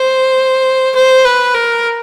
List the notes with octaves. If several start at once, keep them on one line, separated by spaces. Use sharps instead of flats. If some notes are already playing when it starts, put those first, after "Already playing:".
Already playing: C5
C5
B4
A#4